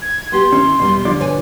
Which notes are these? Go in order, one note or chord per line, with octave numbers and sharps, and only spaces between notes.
G#6
B3 G4 C6
D#3 C#4 E4
E2 B2 G3 B3
D3 F3 D5
B2 C#5 G#5